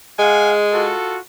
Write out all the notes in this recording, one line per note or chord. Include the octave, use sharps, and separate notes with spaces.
G#3 F5 F#5 G#5
F4 F#4 A4